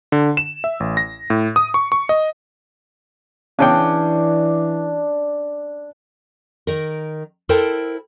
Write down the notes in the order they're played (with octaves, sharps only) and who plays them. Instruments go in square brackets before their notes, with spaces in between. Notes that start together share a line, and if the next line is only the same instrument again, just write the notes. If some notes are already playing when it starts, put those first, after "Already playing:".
[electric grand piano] D3
E7
E5
A1
A#6
A2
D#6
C#6
C#6
D#5
[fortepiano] C#3 C#4 G5 [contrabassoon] E3 [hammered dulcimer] D4
[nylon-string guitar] D#3 A#4
E4 A4 A#4 C5 G5 A5